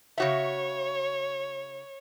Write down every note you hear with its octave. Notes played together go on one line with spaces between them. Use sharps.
C#3 F#4 C#5 E5